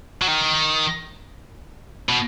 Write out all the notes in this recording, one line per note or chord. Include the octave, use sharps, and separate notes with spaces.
F#3
D#3
B2